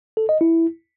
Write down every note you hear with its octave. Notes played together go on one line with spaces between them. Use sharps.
A4
D#5
E4